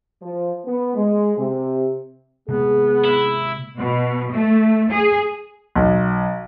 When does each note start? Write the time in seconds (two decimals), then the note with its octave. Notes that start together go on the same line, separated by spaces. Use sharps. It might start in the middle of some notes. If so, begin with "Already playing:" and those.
0.22 F3
0.65 B3
0.95 G#3
1.37 C3
2.48 C3 G#3 A#3 B3 G#4
3.05 E4
3.77 B2
4.31 A3
4.91 G#4
5.75 B1